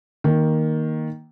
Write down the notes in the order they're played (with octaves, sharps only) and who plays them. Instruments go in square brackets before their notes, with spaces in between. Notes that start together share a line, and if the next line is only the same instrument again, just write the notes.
[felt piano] D#3 A#3